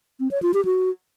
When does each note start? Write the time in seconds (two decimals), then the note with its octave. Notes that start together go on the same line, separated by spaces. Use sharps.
0.20 C4
0.31 C#5
0.42 F4
0.54 G4
0.65 F#4